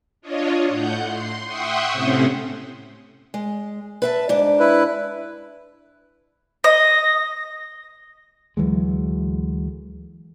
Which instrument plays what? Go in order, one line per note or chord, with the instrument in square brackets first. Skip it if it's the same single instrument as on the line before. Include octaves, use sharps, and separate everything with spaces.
[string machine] D4 F4 C#5 D#5
A2 F#5 G6
C6
E5 F#5 G5 C6 C#6 D#6
A2 C3 C4 C#4 C5
[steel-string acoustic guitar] G#3
B4 E5 A5
G#2 D4
[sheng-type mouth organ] E4 B4
[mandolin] D#5 [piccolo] A#6
[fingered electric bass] D2 E3 F#3 G#3